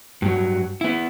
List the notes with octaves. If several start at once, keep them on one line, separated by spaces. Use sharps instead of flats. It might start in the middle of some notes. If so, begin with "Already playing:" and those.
G2 F#3
B3 E4